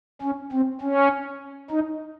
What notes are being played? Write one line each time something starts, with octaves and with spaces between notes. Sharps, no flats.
C#4
C4
C#4
D#4